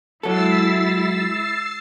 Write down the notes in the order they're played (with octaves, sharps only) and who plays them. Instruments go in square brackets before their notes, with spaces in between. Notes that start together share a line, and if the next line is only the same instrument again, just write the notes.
[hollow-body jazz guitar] F#3 A4 [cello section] G#3 E4 [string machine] E6 A6 C7